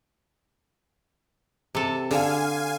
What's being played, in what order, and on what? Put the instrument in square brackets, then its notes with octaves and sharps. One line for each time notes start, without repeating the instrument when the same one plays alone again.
[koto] C3 A4
[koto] D3 [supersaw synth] F5 G#5